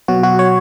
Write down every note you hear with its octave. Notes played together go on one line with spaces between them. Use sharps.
B2 F#3 F#4
F#4
C#5